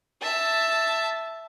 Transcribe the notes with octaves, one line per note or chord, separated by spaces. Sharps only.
E5 A5